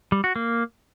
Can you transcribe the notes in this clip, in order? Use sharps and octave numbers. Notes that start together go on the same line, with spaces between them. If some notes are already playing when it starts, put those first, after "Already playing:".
G3
F#4
A#3